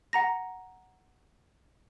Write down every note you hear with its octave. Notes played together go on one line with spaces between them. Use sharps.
F#5 A#5 A#6